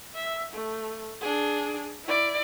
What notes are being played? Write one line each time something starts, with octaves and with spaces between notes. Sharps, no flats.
E5
A3
D4 G#4
E4 D5